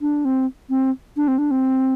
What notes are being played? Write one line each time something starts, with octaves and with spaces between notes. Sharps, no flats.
D4
C4
C4
D4
C4
D4
C4